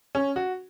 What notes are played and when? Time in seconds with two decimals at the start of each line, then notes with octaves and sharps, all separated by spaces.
0.15 C#4
0.36 F#4